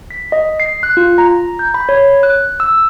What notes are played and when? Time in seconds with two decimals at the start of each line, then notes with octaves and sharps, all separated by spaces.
0.11 B6
0.32 D#5
0.60 C7
0.83 F#6
0.97 F4
1.18 A#5
1.59 G6
1.74 B5
1.89 C#5
2.23 F#6
2.60 E6